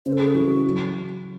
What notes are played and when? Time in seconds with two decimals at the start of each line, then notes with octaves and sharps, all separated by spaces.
0.06 C#3 C5
0.13 A4
0.20 G#4
0.27 A4
0.34 E3 F#4
0.65 F#3